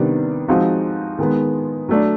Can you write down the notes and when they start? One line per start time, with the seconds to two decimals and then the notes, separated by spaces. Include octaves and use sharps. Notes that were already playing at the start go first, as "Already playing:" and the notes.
Already playing: C3 D#3 G3 B3 D4
0.48 F3 G#3 C4 D#4 F#4
1.19 D#3 G#3 B3
1.89 F#3 A3 D4